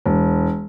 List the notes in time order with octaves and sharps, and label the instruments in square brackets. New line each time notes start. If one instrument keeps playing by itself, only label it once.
[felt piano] E1